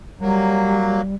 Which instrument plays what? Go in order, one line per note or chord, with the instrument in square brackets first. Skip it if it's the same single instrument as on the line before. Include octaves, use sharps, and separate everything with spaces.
[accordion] F#3 A#3 [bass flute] G3